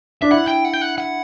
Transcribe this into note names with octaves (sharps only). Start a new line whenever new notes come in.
D4 E5
E4 F#5
G5
F#5
G5
F#5
F#5